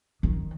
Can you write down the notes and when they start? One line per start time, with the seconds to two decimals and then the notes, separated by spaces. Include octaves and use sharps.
0.23 D#3